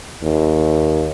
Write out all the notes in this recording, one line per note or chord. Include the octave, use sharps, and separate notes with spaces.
D#2